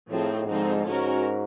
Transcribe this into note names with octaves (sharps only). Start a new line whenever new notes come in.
A2 F3 A3 C4 D#4 G#4
G#2 D3 F3 G#3 C4 D#4
G#2 C#4 F#4 A#4